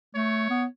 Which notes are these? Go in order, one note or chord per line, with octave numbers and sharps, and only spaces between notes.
A3 C#5
B3